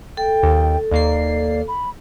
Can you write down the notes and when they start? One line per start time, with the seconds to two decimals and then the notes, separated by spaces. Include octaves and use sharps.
0.17 A4 G5
0.43 D#2
0.91 D#2 A#3 D5 C7
1.68 B5